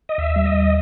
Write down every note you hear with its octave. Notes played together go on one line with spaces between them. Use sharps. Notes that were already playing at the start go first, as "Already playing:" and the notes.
D#5
D#2 E5
G3
D#5
D#2